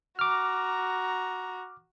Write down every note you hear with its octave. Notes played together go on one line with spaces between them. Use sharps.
F#4 A#5 D6 F6